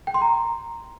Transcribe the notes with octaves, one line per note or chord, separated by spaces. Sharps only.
G5
C6
A#5